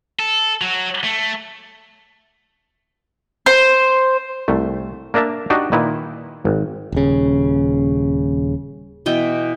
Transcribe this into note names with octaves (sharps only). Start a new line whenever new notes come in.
A4
F#3
A3
C5
C2 A3
A#3 D4 A#4 E5 A5
D4 D#4 F#4 G4 D#5
A#2 D#3 E4 B4
G#1
D#1 C#3
B2 E3 G5